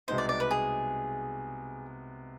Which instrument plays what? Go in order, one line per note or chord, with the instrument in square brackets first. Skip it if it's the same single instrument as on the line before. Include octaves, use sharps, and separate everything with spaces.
[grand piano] C2 B2 G#3 B3 D#4 [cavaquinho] C5
[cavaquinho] D5
D5
B4
G#4